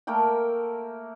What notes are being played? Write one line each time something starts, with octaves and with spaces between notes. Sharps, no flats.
A3 A#3 A#4 G5